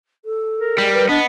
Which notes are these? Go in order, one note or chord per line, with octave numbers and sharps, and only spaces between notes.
A4
A#4
G3 G#3
B4
B3 D4 D#5